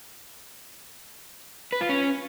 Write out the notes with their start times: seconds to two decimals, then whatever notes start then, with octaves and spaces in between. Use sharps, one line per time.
1.72 B4
1.81 F4
1.89 C#4